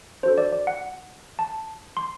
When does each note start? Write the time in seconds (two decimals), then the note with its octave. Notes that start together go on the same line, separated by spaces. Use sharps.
0.23 D4 F#4 A4 C5
0.38 D5
0.52 D5
0.67 F#5
1.39 A5
1.97 C6